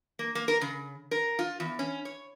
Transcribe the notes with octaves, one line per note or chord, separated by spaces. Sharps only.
A#3
A#3
A#4
C#3
A#4
F4
E2
C#4
C#5